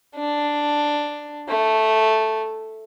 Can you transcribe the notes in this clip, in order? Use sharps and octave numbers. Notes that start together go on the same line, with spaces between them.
D4
A3